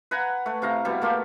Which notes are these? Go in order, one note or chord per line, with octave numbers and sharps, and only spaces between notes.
B4 F#5 G#5 A#5
A3 B4
C3 E4 F5 A#5
B2 G3 E4
A3 A#3 F4 G4